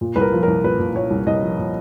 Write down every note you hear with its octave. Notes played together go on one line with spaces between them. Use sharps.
A#2
C2 B4
A#4
F3
C2 A#4
A#2 B4
A#2
A#2 C#5
C2
C2 D#5
F3
A#2